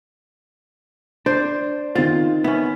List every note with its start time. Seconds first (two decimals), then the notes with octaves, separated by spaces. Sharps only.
1.26 D4 C5
1.95 D#3 C4 F4 A6
2.44 B3 C#4 E4